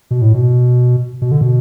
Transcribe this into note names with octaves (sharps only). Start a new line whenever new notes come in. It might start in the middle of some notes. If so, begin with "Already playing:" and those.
B2
A2
B2
B2
D3
B2